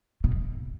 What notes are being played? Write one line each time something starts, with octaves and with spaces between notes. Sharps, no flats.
B2